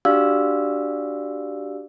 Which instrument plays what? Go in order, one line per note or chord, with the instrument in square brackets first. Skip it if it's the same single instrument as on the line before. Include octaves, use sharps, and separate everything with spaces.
[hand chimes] D4 F#4 G4 D5 F5 E6